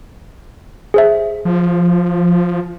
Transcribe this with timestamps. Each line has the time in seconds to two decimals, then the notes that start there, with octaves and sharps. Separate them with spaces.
0.94 G#4 C5 E5
1.45 F3